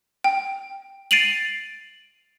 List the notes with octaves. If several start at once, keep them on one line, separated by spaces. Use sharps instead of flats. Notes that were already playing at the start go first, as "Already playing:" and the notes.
G5
A6 C7 D7 D#7 F7 F#7